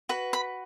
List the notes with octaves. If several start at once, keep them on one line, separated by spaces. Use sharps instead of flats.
F#4 B4
B5